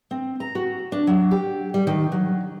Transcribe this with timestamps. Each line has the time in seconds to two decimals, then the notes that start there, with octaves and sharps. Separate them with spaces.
0.11 C4
0.40 A#5
0.55 F#4
0.92 D4
1.07 F#3
1.31 G4
1.74 G3
1.87 D#3
2.12 F#3